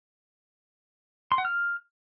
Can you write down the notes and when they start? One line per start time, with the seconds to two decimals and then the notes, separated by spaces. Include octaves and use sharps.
1.32 C6
1.38 F#5
1.45 F6